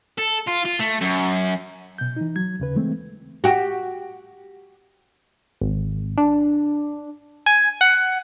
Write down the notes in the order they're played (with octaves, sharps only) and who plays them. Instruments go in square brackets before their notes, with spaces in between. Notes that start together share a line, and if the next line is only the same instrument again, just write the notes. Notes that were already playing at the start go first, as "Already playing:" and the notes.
[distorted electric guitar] A4
F4
F4
A3
F#2
[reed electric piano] B2 G6
E3 D#4
F#3 G#6
D#2 C#3 B4
E3 G#3 A3 C4
[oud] F#4 G4
[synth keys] G#1
D4
G#5
F#5